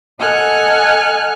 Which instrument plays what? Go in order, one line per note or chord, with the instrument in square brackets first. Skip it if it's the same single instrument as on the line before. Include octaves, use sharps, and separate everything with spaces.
[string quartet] A4 D#5 F#5 G#5 F6 F#6